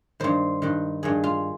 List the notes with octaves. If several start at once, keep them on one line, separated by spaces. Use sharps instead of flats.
G2 D#3 C5
G2 D#3
G2 D#3 G#4
F4